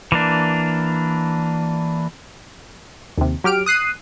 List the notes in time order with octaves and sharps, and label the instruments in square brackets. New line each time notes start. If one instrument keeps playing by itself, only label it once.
[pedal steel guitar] E3 A#3 D4
[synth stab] D#2 C3
F#3 G4 F6 D7
D#6 F#6 C7 D#7